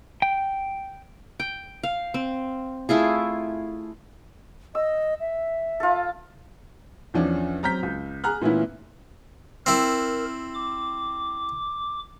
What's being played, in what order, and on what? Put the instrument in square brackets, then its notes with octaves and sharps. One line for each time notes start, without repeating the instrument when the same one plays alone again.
[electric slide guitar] G5
[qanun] G5
F5
C4
A3 E4 F4 G#4
[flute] D#5 [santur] E6
[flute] E5
[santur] F4 A4
[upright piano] E2 F3 C#4 D4
F#3 C4 A#5 F6 G6 B6
C#2
G#4 G#5 A#5 F6 F#6
A#2 E3 A3 B3 C#4 E4
[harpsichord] C4 E4 [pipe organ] A#4
[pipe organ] D6